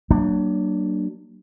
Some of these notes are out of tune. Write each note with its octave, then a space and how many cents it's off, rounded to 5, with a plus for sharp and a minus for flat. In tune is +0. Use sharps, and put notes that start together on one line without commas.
F#3 +35 A#3 +0 D4 +20